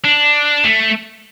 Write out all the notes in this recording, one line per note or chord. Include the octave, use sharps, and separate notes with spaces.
D4
A3